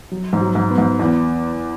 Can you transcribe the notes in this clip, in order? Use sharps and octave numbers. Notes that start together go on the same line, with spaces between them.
F#3
G#2
F#3
G#2
B3
G#2
E2 B3